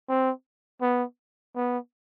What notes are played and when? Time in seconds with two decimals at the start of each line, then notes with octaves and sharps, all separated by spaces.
0.09 C4
0.82 B3
1.56 B3